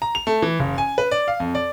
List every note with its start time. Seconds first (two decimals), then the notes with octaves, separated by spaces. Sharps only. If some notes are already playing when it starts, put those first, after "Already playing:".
0.02 A#5
0.15 F7
0.27 A3
0.42 E3
0.60 F#1
0.78 G#5
0.98 B4
1.11 D5
1.28 F5
1.40 F2
1.55 D5